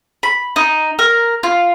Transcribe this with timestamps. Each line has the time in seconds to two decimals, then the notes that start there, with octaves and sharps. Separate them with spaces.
0.23 B5
0.56 D#4
0.99 A#4
1.43 F4